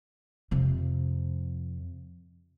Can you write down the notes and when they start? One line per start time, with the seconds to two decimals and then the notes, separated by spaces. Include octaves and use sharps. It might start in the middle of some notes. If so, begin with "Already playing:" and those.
0.51 F2 C3